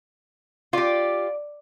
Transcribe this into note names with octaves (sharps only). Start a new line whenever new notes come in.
F4 G4 D5